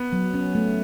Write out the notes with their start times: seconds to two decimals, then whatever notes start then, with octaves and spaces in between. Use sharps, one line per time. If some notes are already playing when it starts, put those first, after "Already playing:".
Already playing: B3
0.13 F#3
0.34 C#4
0.55 A3